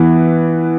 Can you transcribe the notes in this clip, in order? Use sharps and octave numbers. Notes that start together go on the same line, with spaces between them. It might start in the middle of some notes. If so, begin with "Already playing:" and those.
Already playing: E3 B3